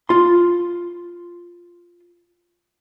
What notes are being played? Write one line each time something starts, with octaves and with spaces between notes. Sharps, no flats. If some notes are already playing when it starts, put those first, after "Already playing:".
F4 C6